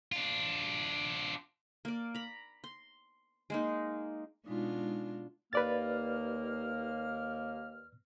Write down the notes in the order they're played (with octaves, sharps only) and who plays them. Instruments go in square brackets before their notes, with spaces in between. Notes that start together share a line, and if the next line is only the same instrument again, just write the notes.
[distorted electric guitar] D4 F4
[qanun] A#3 D5
A#5 B5
C6
G#3 A#3 D#4
[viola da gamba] B2 D4 F4 [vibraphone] G#3 D#4
[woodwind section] D#2 A#3 F6 [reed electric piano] B4 D5 A6